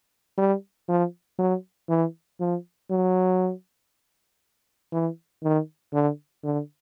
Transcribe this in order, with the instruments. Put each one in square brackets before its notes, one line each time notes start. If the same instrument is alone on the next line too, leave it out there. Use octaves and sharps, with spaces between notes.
[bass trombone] G3
F3
F#3
E3
F3
F#3
E3
D#3
D3
D3